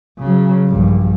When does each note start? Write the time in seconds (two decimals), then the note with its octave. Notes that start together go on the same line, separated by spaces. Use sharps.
0.19 C#3 F#3
0.67 A#1 G2